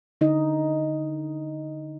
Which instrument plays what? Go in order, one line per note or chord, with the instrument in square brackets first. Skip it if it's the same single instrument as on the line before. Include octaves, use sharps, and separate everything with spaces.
[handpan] D3 D#4 D#5